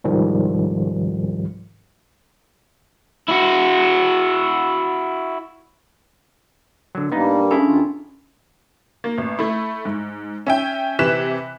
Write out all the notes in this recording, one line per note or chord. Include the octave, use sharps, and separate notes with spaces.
C2 G#2 D#3 F3 G3
E4 F#4
D3 F#3
G2 G3 A#3 B3 D#4
C#4 D4 E4 G#4 A4
D#2 D#3 F4
A#3
A1
A3 E4
G#2
C#4 E5 G5
C3 E3 F#6 B6 E7